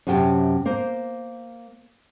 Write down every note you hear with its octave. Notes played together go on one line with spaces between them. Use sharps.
F#2 C3 C#4 G4 G5 A5
A#3 C5